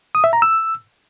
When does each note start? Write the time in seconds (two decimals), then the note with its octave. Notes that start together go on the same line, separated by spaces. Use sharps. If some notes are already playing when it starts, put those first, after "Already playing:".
0.15 D#6
0.24 E5
0.33 A#5
0.42 E6